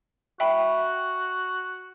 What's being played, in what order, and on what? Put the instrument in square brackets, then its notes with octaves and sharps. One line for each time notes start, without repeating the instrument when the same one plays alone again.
[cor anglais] F#4 [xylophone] E5 G5 B5